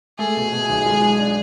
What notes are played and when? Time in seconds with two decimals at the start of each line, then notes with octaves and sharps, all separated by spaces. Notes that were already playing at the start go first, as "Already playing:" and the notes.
0.19 A3 G#4
0.36 B2
0.52 B2
0.69 B1
0.86 G#3
1.02 G#3
1.19 D4